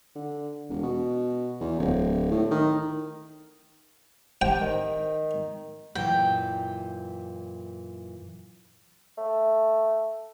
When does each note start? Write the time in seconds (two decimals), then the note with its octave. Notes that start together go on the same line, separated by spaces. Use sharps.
0.15 D3
0.69 E1
0.83 B2
1.60 E2
1.79 D1
2.31 A2
2.51 D#3
4.42 C3 G5
4.61 D#3
5.95 F#2 A#2 E3 G5
9.18 A3